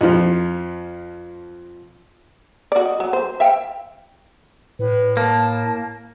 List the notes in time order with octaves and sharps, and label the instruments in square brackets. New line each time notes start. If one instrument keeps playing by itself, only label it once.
[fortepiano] F2 F3
[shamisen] F#4 D5
D#5
F#3
C5
E5 F5 G5
[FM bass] A2 [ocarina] B4
[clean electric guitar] A#3 [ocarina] A5